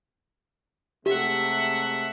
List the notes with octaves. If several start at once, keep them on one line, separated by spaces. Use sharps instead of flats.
C3 G#3 A3 G4 E5 F#5